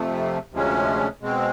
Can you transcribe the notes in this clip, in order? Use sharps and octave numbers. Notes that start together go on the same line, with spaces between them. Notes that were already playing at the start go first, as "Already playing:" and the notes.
Already playing: F2 C3 F3 A3
D2 C3 F3 G#3 C#4
B2 G#3 C4